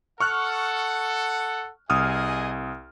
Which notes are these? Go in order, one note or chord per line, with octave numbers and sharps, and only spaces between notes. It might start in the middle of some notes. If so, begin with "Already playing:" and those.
A4 F#5 C#6 F6 F#6
C2 G#4 D#5 G#5 D#6 F6